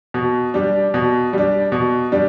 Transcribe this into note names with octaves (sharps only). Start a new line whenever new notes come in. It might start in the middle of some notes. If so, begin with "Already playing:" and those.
B2
G3 D4
B2
G3 D4
B2
G3 D4